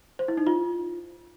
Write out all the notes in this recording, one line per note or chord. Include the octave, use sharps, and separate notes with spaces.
C5
E4
D#4
F4